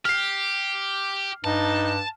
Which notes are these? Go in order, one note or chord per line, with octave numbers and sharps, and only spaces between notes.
G4 F6 C7
G2 D#4 A5